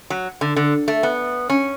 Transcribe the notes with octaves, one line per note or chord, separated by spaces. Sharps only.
F#3
D3
D3
A3
B3
C#4